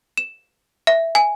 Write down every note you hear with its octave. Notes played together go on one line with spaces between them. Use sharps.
E7
E5
G#5